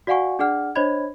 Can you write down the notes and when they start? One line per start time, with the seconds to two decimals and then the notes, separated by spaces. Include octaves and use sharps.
0.07 F#4 D5 F5 F#5 G#5 C#6
0.39 D4 G#4 D5 F#5 F6
0.75 D4 C5 C#5 D#5 B5 G#6